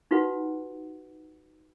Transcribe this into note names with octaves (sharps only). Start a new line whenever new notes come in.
D#4 F4 F#4 B4 F#5